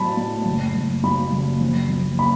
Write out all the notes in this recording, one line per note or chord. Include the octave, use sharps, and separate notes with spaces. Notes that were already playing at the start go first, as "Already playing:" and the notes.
Already playing: A2 F#3 A3 A5 B5
A2
F#1
F#1
F#3 B5
F#1
A#1
A#1
B5